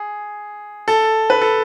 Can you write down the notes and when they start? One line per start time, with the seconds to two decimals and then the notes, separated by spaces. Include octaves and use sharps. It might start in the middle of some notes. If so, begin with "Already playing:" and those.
Already playing: G#4
0.88 A4
1.30 B4
1.41 A4